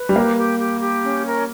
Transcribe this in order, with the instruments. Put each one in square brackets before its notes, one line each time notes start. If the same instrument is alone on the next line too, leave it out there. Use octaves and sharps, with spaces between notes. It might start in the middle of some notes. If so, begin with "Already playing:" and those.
Already playing: [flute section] B4
[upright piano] G3
[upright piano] A#3 [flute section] G4
[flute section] G4
G4
G4
C#4
A#4